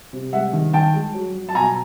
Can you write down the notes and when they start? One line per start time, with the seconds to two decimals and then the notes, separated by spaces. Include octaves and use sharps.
0.13 C3
0.33 G#3 E5 F#5
0.53 D#3
0.73 D#3 G5 A5
0.94 G#3
1.14 F#3
1.34 F#3
1.49 A5
1.55 B2 G#5 A#5